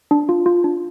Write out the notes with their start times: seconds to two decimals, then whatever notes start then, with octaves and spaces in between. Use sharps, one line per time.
0.11 D4
0.29 F4
0.46 F4
0.64 D4